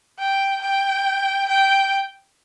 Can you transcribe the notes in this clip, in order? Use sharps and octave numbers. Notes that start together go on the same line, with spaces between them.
G5
G5
G5